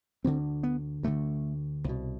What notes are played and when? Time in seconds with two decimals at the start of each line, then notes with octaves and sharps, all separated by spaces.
0.25 D2 D3 C4
0.63 B3
1.03 D2 D3 A3
1.84 C2 B2